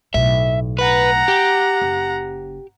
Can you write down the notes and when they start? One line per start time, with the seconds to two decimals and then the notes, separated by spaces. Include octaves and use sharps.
0.14 B1 A2 E5
0.79 B4 F#5 A#5
1.28 G4
1.81 F#1